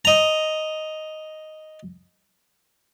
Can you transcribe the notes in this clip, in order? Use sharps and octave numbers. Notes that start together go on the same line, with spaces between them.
D#5 A#5